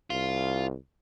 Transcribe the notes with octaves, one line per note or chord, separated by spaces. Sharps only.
C2 F4